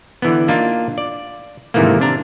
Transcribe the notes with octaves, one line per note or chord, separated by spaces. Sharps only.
D3 E3 B3
A#3 D4 D#4 F4
D5
G#2 C3 D#3 E3 A3 A#3
C3 D4 A#5